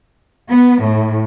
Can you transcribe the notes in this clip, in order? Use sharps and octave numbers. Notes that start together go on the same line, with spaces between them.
B3
A2